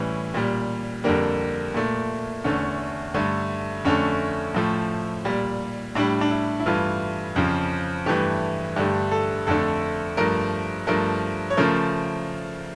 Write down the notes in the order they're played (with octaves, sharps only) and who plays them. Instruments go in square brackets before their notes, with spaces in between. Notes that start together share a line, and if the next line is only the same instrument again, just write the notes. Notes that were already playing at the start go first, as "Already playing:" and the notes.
Already playing: [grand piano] A2 E3 G3 C#4
A#2 G3
F2 D3 G3 A#3
A#2 A3
E2 D3 A3 C#4
G2 D3 A3
F2 D3 A3 C#4
A2 F3 A3
A#2 G3
A2 G3 D4
D4
E4
E4
G2 E3 A3 F4
F2 C#3 F3
G2 E3 A3 G4
G2 D3 A3 G4
A4
F2 D3 A3 A4
G2 F3 A3 A#4
G2 F3 A3 A#4
C#5
C#3 F3 A3 A#4